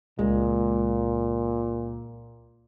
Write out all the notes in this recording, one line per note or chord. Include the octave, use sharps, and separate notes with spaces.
C#2 A#2 G#3